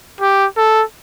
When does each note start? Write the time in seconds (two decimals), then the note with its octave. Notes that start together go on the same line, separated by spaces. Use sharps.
0.21 G4
0.57 A4